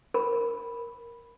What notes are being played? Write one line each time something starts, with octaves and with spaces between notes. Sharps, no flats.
A#4 B5